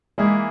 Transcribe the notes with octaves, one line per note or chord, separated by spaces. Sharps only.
E3 G#3 A#3 E4 G#4